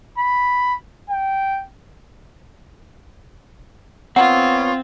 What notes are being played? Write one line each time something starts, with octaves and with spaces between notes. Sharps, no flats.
B5
G5
B3 C4 F4 C#5 F#5